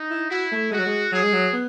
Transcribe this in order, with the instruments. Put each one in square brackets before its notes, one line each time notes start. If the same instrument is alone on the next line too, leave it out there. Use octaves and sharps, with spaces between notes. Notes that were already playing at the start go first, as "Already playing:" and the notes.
Already playing: [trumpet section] D#4
[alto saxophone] E4
[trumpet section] E4 [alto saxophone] F#4
[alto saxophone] A3
[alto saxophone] G#3 [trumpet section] F#4
[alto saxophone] F#3
G#3
[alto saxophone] F#3 [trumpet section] G#4
[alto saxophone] G#3
F#3
B3